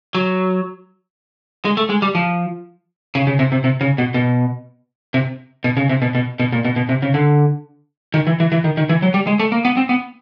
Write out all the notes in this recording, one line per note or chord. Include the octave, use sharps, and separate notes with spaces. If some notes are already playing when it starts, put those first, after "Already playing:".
F#3
G#3
A3
G#3
G3
F3
C#3
C#3
C3
C3
C3
C#3
B2
B2
C3
B2
C#3
C3
B2
B2
B2
A#2
B2
B2
C3
C#3
D3
D#3
E3
E3
E3
D#3
D#3
E3
F#3
G3
G#3
A3
A#3
B3
C4
B3